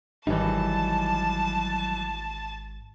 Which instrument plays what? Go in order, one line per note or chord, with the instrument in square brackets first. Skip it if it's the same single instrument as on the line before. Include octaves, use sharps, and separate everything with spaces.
[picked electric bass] G#1 [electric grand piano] E3 G3 [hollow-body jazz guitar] F#3 D#4 [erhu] A5